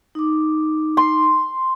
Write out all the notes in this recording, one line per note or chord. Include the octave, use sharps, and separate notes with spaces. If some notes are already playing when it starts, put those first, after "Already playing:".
D#4 D6
C6